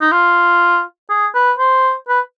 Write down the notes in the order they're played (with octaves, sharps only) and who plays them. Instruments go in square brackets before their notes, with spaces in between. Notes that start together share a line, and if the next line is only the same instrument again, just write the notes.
[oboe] D#4
F4
G#4
B4
C5
B4